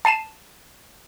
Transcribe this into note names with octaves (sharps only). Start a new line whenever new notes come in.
A5 C7 D#7 E7